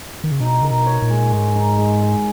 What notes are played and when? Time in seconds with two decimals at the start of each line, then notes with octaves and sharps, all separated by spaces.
0.24 D#3
0.32 C#3
0.40 B2 D#4
0.61 C#3 A#4
0.71 B2
0.86 C#5
1.02 A#2
1.10 G#3
1.32 G#2 G#3
1.55 D#4
1.78 G#3
2.02 G#3